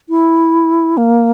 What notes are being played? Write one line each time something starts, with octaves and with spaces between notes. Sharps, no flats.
E4
A#3